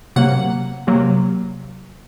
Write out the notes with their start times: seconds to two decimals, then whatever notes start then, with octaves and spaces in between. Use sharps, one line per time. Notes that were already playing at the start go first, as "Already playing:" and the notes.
0.16 C3 F#3 A#3 F#5
0.87 C3 F#3 A#3